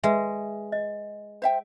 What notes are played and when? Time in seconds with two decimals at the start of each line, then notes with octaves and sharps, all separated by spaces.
0.04 G#3 B4 E5
0.72 D#5
1.42 C5 E5 G5